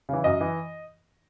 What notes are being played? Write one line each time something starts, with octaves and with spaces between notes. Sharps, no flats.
C#3 E3
F#2 D#5
E3